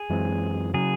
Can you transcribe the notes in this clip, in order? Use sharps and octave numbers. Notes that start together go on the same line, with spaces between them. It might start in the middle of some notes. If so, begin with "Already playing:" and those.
Already playing: G#4
F#2 E3 G#3 C4
C#3 F#3 G#4